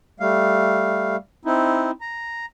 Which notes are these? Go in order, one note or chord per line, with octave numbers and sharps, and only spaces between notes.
G3 A3 F5
C4 D#4 E4
A#5